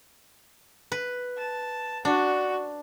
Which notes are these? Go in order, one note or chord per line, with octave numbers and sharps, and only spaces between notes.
B4
A5
D4 F#4